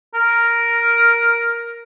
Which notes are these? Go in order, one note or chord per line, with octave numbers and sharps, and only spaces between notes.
A#4